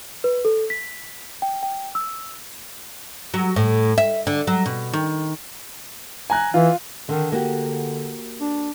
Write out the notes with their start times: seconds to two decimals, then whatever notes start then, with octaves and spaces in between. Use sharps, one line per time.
0.24 B4
0.45 A4
0.70 B6
1.42 G5
1.63 G5
1.95 E6
3.34 F#3
3.56 A2
3.98 E5
4.27 D3
4.47 F#3
4.66 B2
4.93 D#3
6.30 G#5 A#5 F#6
6.54 E3 F4
7.09 D3 D#3
7.32 D3 A#3 F#4 G4
8.40 D4